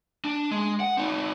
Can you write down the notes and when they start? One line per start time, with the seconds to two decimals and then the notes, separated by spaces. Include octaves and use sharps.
0.25 D4
0.51 G#3
0.80 F#5
0.97 C4 D#4